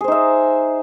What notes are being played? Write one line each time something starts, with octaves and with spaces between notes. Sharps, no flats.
D#4 G#4 C5 E5